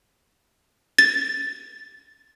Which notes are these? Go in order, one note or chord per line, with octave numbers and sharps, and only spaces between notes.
A6